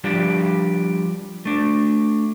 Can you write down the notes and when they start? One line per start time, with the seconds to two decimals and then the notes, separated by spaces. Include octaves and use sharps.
0.04 F3 G3 D4 F4 G4
1.45 A3 D4